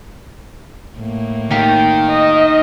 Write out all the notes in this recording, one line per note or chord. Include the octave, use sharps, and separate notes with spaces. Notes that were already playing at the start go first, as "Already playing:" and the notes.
A2 A#3
D#3 F4 G4 A#4
D#5